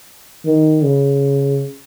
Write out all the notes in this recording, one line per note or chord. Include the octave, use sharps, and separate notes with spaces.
D#3
C#3